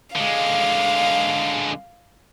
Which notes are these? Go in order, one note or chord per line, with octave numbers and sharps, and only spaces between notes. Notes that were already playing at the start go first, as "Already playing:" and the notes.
D3 G#3 F5